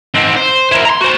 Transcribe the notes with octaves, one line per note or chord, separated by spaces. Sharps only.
G#2 C4
C5
A#3 E4
A#5 C6
F#4 C5